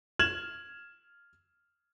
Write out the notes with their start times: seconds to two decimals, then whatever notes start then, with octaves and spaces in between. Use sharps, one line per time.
0.19 F6 G#6 E7 F#7